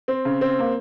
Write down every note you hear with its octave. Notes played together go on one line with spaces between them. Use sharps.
C4
C#3
C4
A#3